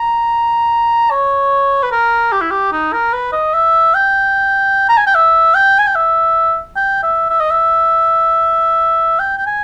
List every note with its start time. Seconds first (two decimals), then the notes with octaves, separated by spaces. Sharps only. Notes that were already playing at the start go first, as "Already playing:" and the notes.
Already playing: A#5
1.11 C#5
1.83 B4
1.92 A#4
2.32 G4
2.41 E4
2.50 G4
2.72 D#4
2.93 A#4
3.13 B4
3.32 D#5
3.54 E5
3.94 G5
4.89 A#5
4.97 G#5
5.07 G5
5.14 E5
5.55 G5
5.79 G#5
5.87 G5
5.95 E5
6.76 G5
7.03 E5
7.30 E5
7.40 D#5
7.50 E5
9.19 G5
9.38 G5
9.46 G#5